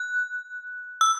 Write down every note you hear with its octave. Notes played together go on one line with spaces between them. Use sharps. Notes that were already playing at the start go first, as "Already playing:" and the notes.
Already playing: F#6
E6